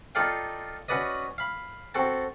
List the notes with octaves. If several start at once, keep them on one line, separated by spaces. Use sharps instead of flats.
D#4 F4 A4 D5 F5 G5
C#4 F#4 B4 D5 D#5
F5 B5
C4 F#4 A4 G5 A5